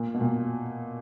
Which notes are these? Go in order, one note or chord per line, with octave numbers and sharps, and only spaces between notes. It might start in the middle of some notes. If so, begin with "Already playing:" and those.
Already playing: A#2
B2
A#2